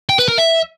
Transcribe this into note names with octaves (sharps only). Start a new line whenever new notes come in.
G5
B4
A#4
E5